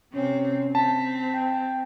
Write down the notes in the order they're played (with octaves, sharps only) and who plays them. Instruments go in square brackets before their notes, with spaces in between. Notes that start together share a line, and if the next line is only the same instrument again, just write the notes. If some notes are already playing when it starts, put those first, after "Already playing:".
[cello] C3 C4 [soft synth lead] C#4
[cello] C4 [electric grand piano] A5 [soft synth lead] B6
[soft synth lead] G5